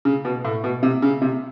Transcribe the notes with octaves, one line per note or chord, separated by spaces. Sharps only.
C#3
B2
A2
B2
C3
C#3
C3